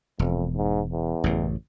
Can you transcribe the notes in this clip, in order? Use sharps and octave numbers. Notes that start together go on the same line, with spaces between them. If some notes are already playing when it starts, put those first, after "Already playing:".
E1 F2
G#2
E2
A1 F#2 C#3